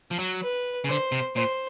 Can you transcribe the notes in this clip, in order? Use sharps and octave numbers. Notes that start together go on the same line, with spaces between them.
F3
F#3
B4
C#3
D3 C5
C3
A#2 C5